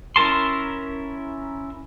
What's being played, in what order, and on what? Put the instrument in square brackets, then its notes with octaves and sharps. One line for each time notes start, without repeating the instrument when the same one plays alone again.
[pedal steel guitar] C#4 E4 A#4 A5 C6